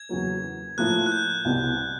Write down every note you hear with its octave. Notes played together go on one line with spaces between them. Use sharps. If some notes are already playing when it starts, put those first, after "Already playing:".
Already playing: G#6
E2 C#3 F#3 A#3
A2 F3 A#3 F#6
F#6
G6
C2 B2 G3 C4